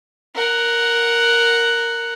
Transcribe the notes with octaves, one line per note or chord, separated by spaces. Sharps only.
A#4 F#5